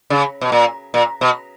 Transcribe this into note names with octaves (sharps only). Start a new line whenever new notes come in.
C#3
B2
A#2
A#2
B2